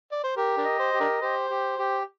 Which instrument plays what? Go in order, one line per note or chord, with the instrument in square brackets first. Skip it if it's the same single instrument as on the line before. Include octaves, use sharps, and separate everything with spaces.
[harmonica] D5
C5
[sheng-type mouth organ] G4 [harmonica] A#4
[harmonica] D4 A#4
[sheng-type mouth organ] D#5
[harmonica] C5
[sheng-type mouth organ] G4
[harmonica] D4 A#4
[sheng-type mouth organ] G4 [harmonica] C5
[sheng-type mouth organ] G4
G4